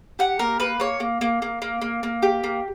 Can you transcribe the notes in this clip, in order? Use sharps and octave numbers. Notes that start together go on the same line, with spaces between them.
G4 F#5
A#3 A#4
A#3 B4
A#3 C#5
A#3
A#3
A#3
A#3
A#3
A#3
G4
A#3